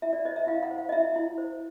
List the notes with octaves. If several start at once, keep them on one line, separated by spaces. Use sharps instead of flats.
E4 E5
D5
C5 D#5
E5
E4 F5
F#5
C5
F5
D#5
E4 E5
E4
C5